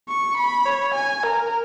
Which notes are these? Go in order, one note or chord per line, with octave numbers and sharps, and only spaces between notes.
C#6
B5
C#5
G#5
A#4